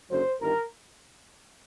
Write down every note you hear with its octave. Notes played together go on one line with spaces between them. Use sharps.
F#1 F#2 D3 F#3 C5
G1 G2 D#3 A#4